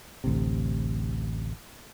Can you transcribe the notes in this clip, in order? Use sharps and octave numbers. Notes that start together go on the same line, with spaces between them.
A1 D2 C3